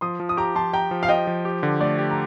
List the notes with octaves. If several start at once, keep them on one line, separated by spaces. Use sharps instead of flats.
F3 C6 D#6
F3
D#6
G4 A#5 D6
F3 A5 C6
G4 G5 A#5
F3
F5
F3 D#5 G5
F3
G4
D3
A3 D5
G4
A#5